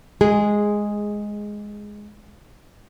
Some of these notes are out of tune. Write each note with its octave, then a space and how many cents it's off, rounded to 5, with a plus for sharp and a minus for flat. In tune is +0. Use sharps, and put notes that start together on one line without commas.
G#3 +0 G#4 -10